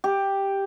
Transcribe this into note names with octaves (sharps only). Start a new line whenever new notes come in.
G4